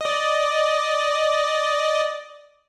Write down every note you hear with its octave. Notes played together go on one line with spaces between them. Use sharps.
D5 D#5